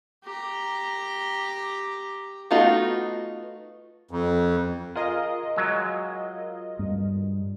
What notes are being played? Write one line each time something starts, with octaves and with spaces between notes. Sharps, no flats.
G4 A#5
A3 B3 D#4 F4 F#4
F2
F4 G#4 A#4 D#5
F#3 G#3
G2